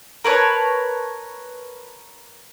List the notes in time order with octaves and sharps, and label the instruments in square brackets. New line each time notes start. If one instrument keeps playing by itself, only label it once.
[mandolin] A#4 B4 C#5 A5